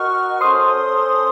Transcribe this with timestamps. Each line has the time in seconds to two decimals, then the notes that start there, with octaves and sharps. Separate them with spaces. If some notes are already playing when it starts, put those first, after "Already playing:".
Already playing: F#4 A#4 D#5 F#5 C#6 F6
0.41 C#4 A4 C5 C6 D#6